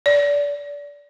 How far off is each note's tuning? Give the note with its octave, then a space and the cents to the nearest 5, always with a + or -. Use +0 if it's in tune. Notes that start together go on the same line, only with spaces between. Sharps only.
D5 -25